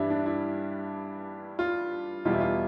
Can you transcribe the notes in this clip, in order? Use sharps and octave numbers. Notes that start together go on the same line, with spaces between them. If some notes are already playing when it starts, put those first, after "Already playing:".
Already playing: G2 E3 G3 D4 E4
D4
E4
F4
E2 B2 G3 F4
E4
F4